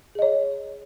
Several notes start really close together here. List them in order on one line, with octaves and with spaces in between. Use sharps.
G#4 D#5 C#5